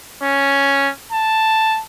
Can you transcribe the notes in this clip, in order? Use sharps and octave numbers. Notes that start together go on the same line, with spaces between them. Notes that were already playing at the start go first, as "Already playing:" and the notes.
C#4
A5